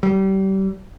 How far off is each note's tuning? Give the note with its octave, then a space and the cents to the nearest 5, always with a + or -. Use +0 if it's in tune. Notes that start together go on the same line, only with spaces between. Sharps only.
G3 -30